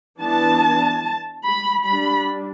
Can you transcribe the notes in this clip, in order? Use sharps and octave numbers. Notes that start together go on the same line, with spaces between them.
E3 B3 D4 A5
B5
G3 D4 B5